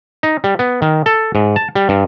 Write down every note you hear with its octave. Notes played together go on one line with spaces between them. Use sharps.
D#4
G3
B3
D#3
A4
G#2
A5
G3
G2